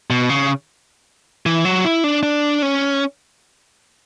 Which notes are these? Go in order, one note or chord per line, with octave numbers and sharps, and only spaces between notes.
B2
C#3
E3
F#3
E4
D4
D4
C#4